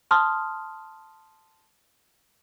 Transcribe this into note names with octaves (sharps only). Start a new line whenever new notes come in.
A5 C6 D#6 F6